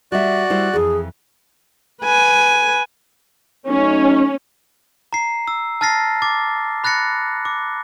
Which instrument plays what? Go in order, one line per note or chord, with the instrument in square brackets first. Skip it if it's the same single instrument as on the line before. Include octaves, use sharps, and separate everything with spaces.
[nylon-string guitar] G3 E5 [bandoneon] F#4 D5 F#6
[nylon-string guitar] G3 E4 C5
[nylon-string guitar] F2 E3 [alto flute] G#4
[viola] B4 G#5
[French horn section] F#3 A3 D#4 [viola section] C#4
[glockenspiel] A#5 C7
E6
A5 F6 A6 A#6 C7
D6 A6
B5 F#6 A6 A#6 C#7
D6